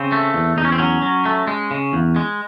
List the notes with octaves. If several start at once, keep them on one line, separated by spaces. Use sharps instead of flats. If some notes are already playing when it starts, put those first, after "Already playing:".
Already playing: C#3 C4
A3
E2
E2 D#4
C#4
C4
F#3 C#4
F#3
A3
G#3
C#3
E2
G#3